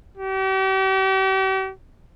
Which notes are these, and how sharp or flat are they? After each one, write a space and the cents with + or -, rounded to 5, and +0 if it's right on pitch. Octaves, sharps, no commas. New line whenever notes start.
G4 -40